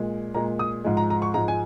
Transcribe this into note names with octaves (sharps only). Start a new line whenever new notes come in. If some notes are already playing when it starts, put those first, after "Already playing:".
Already playing: A#2 G#3
A#2 G#3 A#5
D#6
G#2 F3 G#3
A#5
A#5
C#6
G#2 F3 G#3 A#5
G#5